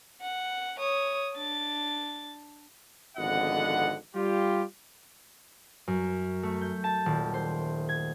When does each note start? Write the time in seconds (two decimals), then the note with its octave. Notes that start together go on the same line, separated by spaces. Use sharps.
0.21 F#5
0.80 C#5 D#6
1.35 D4 A6
3.17 G#1 F2 D3 B3 D#5 F#5
4.15 G3 F4 G4
5.87 F#2
6.43 A3
6.61 G6
6.84 A5
7.06 D#1
7.34 C5
7.89 G#6